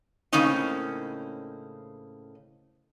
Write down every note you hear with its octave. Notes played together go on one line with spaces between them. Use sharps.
A2 C#3 A#3 C4 C#4 D#4